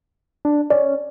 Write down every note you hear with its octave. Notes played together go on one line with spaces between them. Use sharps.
D4
C#4 D5